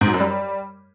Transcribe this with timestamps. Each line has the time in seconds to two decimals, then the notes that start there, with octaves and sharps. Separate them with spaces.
0.01 G#2
0.07 F#3
0.14 F#2
0.20 G3